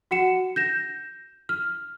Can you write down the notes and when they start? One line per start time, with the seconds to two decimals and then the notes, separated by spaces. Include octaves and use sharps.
0.11 F#4 F#5 C#7 E7
0.56 G6 A#6 E7
1.49 F6